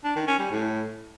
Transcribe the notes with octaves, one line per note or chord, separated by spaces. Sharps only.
D4
D#3
C#4
G3
A2